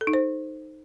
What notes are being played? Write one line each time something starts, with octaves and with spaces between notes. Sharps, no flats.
A4
D#4
C5